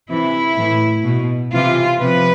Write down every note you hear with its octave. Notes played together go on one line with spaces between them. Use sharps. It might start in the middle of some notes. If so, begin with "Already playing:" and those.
C3 E3 E4
A2 E3
B2
C3 E3 F4
C3 F3 B4